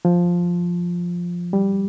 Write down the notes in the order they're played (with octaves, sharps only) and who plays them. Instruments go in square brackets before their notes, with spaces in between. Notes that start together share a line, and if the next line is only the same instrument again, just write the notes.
[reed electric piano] F3
G3